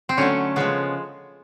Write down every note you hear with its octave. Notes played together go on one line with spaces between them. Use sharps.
C4
D3 F#3 A3 C#4
C#3 F3 G#3 B3